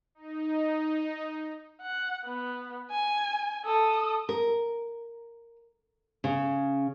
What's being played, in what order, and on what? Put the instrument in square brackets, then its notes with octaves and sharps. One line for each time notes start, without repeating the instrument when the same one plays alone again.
[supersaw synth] D#4
[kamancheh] F#5
B3
G#5
A4 D#6
[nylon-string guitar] A#4
C#3